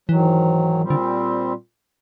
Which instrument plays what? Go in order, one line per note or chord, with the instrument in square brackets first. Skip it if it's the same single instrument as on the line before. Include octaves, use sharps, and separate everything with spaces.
[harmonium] G#2 D#3 F#3 [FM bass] E3
[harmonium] A#2 G3 C4
[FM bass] D3